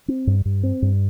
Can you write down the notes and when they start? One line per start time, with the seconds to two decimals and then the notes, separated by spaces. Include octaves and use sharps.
0.08 C4
0.27 G2
0.45 G2
0.63 C4
0.82 G2